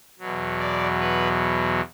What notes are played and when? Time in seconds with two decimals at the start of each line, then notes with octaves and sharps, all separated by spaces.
0.19 E2 B2 F#3
0.59 D5
1.00 B4